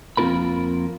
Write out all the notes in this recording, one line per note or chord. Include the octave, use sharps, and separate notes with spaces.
F2 A#3 C4 F4 A#4 B5